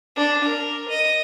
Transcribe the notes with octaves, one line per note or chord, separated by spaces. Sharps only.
D4
A#4
D#5